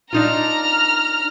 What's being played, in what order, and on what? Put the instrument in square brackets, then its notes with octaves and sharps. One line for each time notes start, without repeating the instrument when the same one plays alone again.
[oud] D4 D#4 F4 [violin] A#5 F6